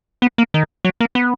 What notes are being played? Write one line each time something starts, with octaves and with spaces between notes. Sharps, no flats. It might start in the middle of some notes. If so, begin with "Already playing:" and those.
B3
A#3
D#3
F#3
A#3
B3